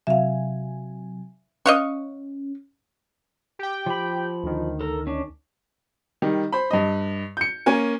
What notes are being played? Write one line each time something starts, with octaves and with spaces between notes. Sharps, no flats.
C3 F#3 E5 F5 G#5
C#4 D#5 F5 C#6 F#6
G4 G5
F3 B5
D2 D#3
A4 A#4
C#4 D4
D#3 G3
C5 B5
G2 D#5
G6 C#7
A#3 C#4 A#4 G#5